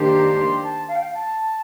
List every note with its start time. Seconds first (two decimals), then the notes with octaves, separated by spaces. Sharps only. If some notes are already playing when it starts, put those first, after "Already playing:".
Already playing: D#3 A#3 D4 G4 C5
0.14 A#5
0.38 C6
0.64 A5
0.88 F5
0.96 G5
1.03 F5
1.14 A5